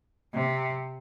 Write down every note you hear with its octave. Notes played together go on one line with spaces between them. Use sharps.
C3